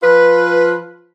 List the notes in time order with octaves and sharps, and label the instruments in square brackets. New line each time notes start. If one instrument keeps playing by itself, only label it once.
[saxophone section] F3 F4 B4